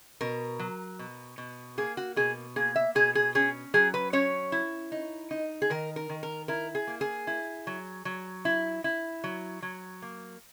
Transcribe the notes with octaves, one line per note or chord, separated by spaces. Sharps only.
B2 A#4
F#3
B2
B2
A#3 G#4
F#4
B2 G#4
A#3 G#4
E5
B2 G#4
G#4
C#4 G#4
F#3 G#4
B4
C#4 C#5
E4
D#4
D#4
G#4
D#3 A#4
A#4
D#3
A#4
E4 A#4
G#4
A#3
G#4
E4
F#3
F#3
E4
E4
F#3
F#3
A#3